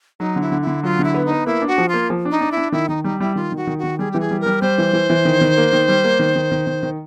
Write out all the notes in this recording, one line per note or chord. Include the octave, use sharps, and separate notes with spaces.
F#3 D#4
D3
E4
D3
E4
D3
F#3 F4
D3
E4
B3
D#4
B3
A#3 E4
D4
F#4
F3
F4
A#3
F3
D4
D#4
D4
E4
D4
D#3 E4
D#3 D#4
G3 D#4
G3 E4
D#3 F4
D#3 F#4
D#3
D#3 F#4
G3 G#4
E3 G4
G#4
G3
A#4
G3
G3 C5
E3
E3
E3
D#3
D#3
A#3
D#3
G3
A#3
D#3
D#3
D#3
D#3
D#3